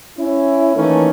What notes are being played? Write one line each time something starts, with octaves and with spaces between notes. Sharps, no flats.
C#4 E4
D#3 E3 A3 A#3 C#4